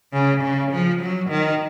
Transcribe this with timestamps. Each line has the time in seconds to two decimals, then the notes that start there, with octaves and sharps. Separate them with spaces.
0.13 C#3
0.43 C#3
0.71 F3
1.01 F#3
1.30 D#3